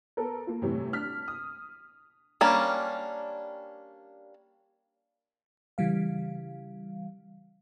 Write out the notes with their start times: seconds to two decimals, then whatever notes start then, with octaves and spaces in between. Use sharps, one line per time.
0.17 B3 A4 A#4
0.47 A#3 F4
0.62 A2 C3 E3 G3
0.93 D4 F6 B6
1.28 D#6
2.41 G3 A#3 C#4 D4
5.78 C#3 E3 G3 F5